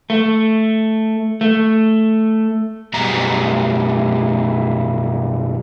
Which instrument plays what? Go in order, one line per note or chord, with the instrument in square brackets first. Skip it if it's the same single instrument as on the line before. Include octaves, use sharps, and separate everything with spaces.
[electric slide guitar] A3
A3
F#2 B2 G3 A#5